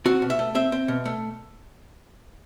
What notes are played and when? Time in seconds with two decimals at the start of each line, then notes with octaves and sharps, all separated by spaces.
0.06 C4 F#4
0.22 B2
0.30 E5
0.39 A3
0.55 C4 E5
0.72 C4
0.88 B2
1.05 A3